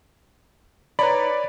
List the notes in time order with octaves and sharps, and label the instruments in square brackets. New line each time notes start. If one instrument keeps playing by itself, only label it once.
[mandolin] D#4 E4 A#5 [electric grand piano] B4 C#5 D5 [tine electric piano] B5